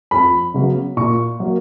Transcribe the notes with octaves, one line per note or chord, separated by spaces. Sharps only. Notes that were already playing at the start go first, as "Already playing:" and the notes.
F2 B5
C#3 F#3 B3
A#2 C#6
F#3 A#3